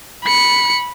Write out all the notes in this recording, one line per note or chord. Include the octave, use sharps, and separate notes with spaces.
B5 C#7